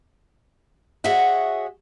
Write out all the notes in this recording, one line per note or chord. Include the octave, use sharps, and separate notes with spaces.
F#4 G#4 C#5 D#5 E5 F#5